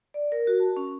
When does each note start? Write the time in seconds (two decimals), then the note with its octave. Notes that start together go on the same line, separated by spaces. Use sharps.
0.14 D5
0.32 A#4
0.47 F#4
0.60 A5
0.77 C#4